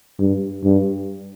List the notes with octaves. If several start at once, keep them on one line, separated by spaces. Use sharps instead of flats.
G2
G2